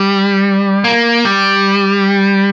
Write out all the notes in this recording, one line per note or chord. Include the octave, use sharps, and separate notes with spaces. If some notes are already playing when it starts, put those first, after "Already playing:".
Already playing: G3
A#3
G3